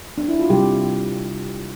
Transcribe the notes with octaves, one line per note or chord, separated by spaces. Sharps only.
D4
E4
F4
C3 G3 G4